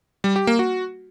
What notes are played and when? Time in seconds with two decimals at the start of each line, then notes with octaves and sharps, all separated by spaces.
0.24 G3
0.36 G4
0.47 A#3
0.59 F#4